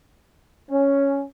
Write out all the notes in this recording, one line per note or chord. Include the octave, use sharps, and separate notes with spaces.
C#4